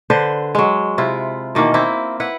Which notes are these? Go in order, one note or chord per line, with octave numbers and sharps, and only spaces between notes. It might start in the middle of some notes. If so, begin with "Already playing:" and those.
D3 B4 C5
F#3 G#3
C3 E4 F4
B2 D#3 E3 A#3
A#3 C4 E4
E4 B4 F#5